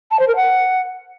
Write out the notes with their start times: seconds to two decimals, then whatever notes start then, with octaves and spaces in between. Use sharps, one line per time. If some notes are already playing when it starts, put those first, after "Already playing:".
0.11 A5
0.19 C5
0.28 A#4
0.36 F#5